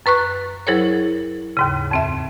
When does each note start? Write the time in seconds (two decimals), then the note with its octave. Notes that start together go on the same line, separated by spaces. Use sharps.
0.06 F#2 B4 C#6 F#6
0.67 F#3 E4 G#4 A#4 C5 C#5
1.57 D#2 G#2 C#3
1.91 F2 C4 E5